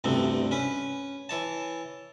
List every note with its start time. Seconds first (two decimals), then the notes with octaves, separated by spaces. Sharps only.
0.04 A1 D2 G2 C3 A3
0.51 C#4 B4
1.29 E3 C#5 A5